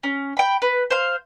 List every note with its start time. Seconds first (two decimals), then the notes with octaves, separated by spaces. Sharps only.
0.03 C#4
0.37 G5 B5
0.62 B4
0.91 C5 F5